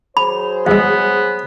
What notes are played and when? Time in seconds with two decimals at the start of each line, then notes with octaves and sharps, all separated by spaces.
0.17 F#3 G#4 C5 B5
0.67 E2 G#3 B3